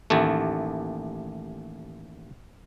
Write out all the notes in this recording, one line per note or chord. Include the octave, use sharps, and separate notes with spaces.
A1 D#2 A3